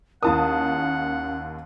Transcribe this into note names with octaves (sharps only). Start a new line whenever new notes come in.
D#2 C#4 E4 A#4 F#5 A5 D#6